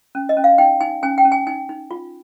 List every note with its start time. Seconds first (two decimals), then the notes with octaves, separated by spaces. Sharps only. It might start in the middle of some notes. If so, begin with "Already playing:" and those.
0.15 C#4
0.29 D#5
0.37 C#4
0.44 F5
0.58 D#4 G5
0.81 D#4 G#5
1.03 C#4 G#5
1.18 G5
1.25 C#4
1.32 G#5
1.47 D#4 G#5
1.69 D#4
1.91 F4